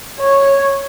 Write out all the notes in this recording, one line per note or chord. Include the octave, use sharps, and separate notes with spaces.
C#5